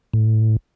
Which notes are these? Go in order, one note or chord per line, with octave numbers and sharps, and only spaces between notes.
A2